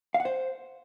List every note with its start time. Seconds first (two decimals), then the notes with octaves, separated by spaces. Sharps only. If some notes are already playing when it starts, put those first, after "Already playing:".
0.14 F5
0.20 F#5
0.25 C5